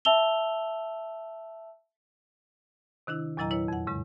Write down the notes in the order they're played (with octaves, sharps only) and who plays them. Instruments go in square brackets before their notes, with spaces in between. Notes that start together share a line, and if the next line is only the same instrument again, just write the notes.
[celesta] E5 A5 E6 F7 G7
[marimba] C3 D#3 D4 E4
E2 A#2 F#3 E4 D#5 A#5
E4 B4 C#5
F2 F#5
A2 C#3 G#3